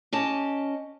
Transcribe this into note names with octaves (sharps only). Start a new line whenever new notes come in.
C#4 G4 D#5 A5